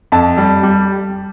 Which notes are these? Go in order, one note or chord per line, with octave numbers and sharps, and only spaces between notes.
F2 A5
G3
G3